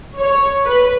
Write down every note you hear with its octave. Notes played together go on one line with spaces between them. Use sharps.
C#5
B4